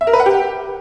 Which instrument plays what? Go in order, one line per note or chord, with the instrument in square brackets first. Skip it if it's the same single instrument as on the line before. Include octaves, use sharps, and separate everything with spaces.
[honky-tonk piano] E5
A#4
B4
F#5
G4